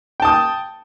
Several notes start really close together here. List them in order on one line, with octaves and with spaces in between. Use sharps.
G5 A5 D#6